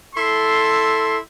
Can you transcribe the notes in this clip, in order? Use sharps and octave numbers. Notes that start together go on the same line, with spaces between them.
E4 A4 C6